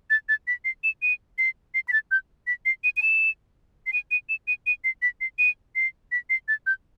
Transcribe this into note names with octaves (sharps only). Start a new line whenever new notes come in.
A6
A6
B6
C7
E7
D#7
C7
C7
B6
A6
G6
B6
C7
D#7
D#7
E7
C7
D#7
D#7
E7
D#7
D#7
C7
B6
C7
D#7
C7
B6
C7
A6
G6